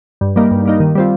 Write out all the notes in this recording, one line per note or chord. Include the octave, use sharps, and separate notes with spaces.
G2
G3 A#3 D#4
G2
G3 A#3 D#4
D#3
G3 C4 F4